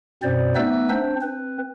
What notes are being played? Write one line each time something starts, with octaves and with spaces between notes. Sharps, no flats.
F#2 B2 C4 C5 D5
A3 B3 D#4 B4 E5 E6
C4 D4 C5
C4 B4